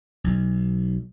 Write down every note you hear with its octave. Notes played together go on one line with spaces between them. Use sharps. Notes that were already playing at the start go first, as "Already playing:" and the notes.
B1